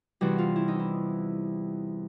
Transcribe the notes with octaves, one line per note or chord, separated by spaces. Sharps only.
E2 C3 E3 G3 F#4
F4
E4
D#4
E4